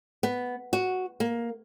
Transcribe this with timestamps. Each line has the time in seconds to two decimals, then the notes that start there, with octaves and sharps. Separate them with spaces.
0.23 B3
0.73 F#4
1.20 A#3